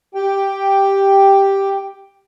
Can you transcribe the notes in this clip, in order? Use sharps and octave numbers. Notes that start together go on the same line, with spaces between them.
G4 G5